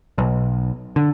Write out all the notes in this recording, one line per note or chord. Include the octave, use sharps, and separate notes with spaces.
B1
D3